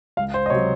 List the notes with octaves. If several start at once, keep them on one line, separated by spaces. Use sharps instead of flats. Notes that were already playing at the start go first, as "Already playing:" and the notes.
C#2 F5
C5
D#5
C3 F#3 C#5